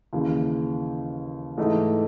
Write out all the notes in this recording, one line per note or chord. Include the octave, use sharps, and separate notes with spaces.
D#2 C#3 E3
G#2 E3 A3 D#4